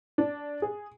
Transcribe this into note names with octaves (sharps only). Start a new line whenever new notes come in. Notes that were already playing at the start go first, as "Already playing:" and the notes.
D4
G#4